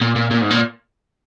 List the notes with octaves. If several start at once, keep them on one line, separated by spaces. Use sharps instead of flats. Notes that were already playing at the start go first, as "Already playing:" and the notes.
A#2
A#2
A#2
G#2
A#2